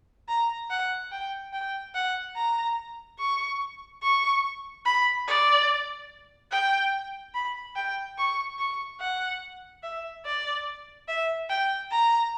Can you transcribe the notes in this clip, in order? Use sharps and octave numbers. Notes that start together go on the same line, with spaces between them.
A#5
F#5
G5
G5
F#5
A#5
C#6
C#6
B5
D5
G5
B5
G5
C#6
C#6
F#5
E5
D5
E5
G5
A#5